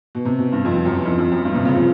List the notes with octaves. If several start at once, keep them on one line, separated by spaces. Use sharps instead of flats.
B2
C3
B2
G2
F2
F2
F#2
E2
F2
F2
F#2
G2
C3
C#3
F3